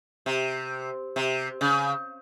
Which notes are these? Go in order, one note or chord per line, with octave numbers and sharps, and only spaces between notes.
C3
C3
C#3